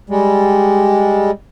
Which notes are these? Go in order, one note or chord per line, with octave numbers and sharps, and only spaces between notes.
G3 G#3